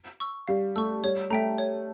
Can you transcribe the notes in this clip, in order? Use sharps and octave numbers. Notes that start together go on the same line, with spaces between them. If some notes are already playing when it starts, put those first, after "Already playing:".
C#6 E6
G3 F5
A3 C#6 E6
G3 C#5
A3 E5 G5 A#5
C#5